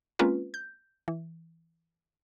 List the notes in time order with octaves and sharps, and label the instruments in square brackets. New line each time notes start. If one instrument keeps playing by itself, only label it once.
[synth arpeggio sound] G#3 A#3 C4 C#4 F4 B4
G6
E3